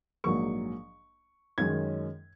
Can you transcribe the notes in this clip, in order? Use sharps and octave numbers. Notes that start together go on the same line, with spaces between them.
A#1 G#2 F#3 A#3 C#6
F#2 D#3 G#3 C#4 G#6